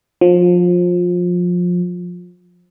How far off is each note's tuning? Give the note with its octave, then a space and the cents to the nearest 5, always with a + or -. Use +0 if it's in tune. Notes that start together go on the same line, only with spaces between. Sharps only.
F3 +25